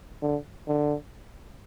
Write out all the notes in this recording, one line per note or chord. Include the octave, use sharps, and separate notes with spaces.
D3
D3